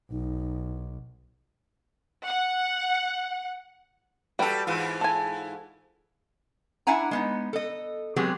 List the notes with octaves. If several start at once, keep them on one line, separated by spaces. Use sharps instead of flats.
B1 D#4
F#5
G3 F#4 A4 B4 G5
G#2 E3 F4
A4 G#5
D4 E4 E5 F#5 G#5 A#5
G#3 B3 D#4
A4 D#5
F#3 G#3 B3 C4 G4 G#4